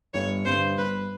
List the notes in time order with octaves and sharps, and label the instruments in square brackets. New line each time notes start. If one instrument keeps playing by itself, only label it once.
[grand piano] G1 [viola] C#5
[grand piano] G2 D3 [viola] C5
[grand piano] G1 [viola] B4